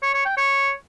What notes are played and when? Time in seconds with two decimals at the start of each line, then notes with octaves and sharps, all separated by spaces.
0.02 C#5
0.14 C#5
0.25 G5
0.37 C#5